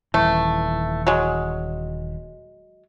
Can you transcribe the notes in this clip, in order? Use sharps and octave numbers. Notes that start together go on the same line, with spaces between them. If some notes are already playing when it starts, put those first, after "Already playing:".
D#1 E3 A3
F#3 G#3